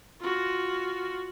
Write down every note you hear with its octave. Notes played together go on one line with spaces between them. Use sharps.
F4 F#4